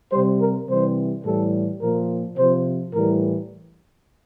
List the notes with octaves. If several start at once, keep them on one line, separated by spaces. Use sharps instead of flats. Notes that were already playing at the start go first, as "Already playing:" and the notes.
C3 G3 C5
A#4
C3 E3 G3 C5
A2 E3 G3 A4
A#2 F3 A#4
C3 F3 C5
A2 E3 G3 A#4